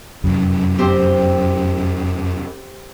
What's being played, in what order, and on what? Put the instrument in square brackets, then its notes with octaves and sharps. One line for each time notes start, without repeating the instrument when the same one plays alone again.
[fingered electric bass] F1 F#2
[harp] C4 G4 C5